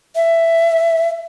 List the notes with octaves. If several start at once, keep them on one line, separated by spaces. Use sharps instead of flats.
E5